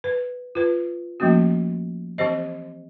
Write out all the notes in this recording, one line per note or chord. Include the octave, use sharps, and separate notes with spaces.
B4
F4 B4
F3 A3 A#3 C#4 F#4
E3 C4 G4 C5 D#5